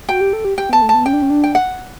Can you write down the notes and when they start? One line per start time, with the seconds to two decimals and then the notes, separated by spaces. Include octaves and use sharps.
0.08 F#4 G5
0.21 G4
0.33 A4
0.45 G4
0.58 G4 G5
0.69 B3 A5
0.82 A3
0.89 A5
0.94 B3
1.06 C#4 G5
1.13 D4
1.22 C#4
1.30 D4
1.44 G5
1.55 F#5